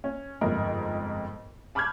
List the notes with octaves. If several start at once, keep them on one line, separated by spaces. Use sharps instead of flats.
C#4
G1 F2 G#2 A#4
A5 B5 D6 F6 G6 G#6